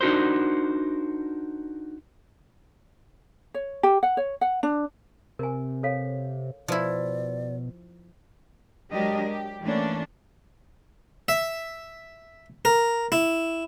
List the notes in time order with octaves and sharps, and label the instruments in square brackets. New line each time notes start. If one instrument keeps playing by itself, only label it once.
[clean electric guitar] D4 D#4 F#4 A#4 C5
[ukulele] C#5
G4
F#5
C#5
F#5
D4
[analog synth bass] C3 [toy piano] A#4 G#5
[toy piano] A4 C#5 F5
[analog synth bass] B2 [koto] F3 E4 [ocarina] D5
[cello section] F#3 G#3 D4 G4 A#4 D#5
G4
E3 A3 A#3 C#4 D4
[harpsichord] E5
A#4
E4